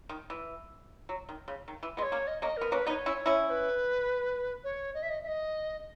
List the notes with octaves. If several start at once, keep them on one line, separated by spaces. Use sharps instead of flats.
D#3
E3
F#3
D#3
C#3
D#3
E3
G#3 B3 D#5
C#5
A#3 C#4
D#5
A#3 C#4 D#5
B3 A#4
A#3 C#4 B4
B3 D#4 D#5
C#5
C#4 E4
C#4 E4
C#5
B4
C#5
D#5
E5
D#5
E5
D#5